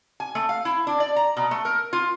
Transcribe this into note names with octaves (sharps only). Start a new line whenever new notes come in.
G#5
A3
F5
E4
D4
D5
A#5
B2
A3
A#4
F4